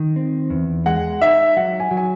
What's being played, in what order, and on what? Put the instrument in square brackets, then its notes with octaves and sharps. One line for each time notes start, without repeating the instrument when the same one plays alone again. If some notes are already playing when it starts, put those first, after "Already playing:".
Already playing: [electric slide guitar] D#3
C4
E2
[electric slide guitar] G#3 [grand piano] F#5
[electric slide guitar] D#4 [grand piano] E5
[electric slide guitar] F#3 [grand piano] F#5
[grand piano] G#5
[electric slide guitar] F#3
[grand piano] G#5